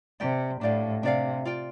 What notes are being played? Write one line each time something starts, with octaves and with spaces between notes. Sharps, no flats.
C3 G4 D5 G5
A2 D4 G4 D5 F5
C3 D4 G4 D5 F5
F4 D5 G5